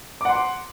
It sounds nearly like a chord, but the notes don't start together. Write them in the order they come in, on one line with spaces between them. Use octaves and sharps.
D6 F#5 C6